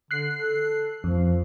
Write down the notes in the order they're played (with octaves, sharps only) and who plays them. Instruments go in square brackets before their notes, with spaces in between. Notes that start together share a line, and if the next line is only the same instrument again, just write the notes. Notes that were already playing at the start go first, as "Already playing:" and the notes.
[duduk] D3 [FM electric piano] F#6 C7
[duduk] A4
[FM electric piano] F2 [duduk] F3